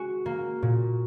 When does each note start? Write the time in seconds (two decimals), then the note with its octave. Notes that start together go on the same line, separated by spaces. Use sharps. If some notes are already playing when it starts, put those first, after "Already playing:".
Already playing: G#3 F#4
0.26 A#3
0.62 A#2